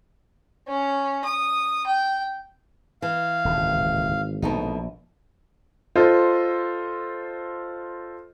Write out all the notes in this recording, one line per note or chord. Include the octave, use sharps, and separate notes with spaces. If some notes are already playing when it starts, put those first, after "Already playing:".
C#4
D#6
G5
E3 F5
D#1 G#1 C#2 A2
A#1 B2 A3 D#4
F4 A4 C5 D#5